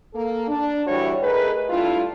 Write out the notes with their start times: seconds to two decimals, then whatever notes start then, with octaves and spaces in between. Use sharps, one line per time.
0.14 A#3 A4
0.47 D4
0.87 D2 E3 G3 E4 F#4 C#5
1.22 A3 D#4 G#4 A#4 B4
1.70 G3 A3 D4 E4 F4